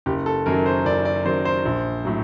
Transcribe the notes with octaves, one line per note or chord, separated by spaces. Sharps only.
F#1 G4
A4
F#2 D#3 F#3 A#4
C5
F#1 D5
D5
F#2 D#3 F#3 C5
C5
A#1
A2 F#3